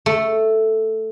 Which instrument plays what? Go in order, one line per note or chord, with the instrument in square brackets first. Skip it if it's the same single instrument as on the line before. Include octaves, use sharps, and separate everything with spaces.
[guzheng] A3